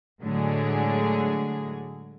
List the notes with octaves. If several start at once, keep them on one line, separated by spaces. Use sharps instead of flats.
A2 D3 F#3 G#3 G#4